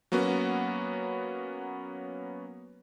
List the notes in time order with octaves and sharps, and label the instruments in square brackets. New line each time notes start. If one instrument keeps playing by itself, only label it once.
[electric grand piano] F#3 A#3 B3 C#4 F#4